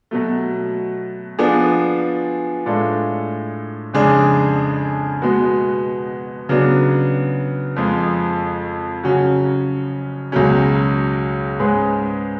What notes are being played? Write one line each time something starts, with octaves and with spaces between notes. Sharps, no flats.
B2 F#3 A3
F3 B3 D4 G#4
A2 G#3 D4 F4 A4
F2 C#3 G#3 D4 G#4
B2 G#3 B3 F#4
C#3 F#3 B3 D4
F2 F3 G#3
C#3 F#3 C#4 F#4
C#2 B2 F#3 C#4
G#2 G#3 C#4 G#4 B4